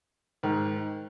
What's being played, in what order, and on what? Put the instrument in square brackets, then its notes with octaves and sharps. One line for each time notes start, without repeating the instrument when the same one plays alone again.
[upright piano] G#2 D#3